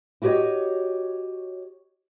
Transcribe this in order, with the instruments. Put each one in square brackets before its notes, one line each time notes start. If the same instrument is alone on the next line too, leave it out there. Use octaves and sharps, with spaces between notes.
[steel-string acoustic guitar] E4 F#4 G4 B4 C#5 D#5